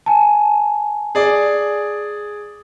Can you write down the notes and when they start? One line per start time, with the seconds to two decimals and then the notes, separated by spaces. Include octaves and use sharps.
0.06 G#5 A5
1.15 G#4 D5